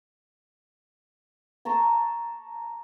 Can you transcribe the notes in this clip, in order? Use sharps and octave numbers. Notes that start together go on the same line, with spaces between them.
A5 A#5 C#6 D6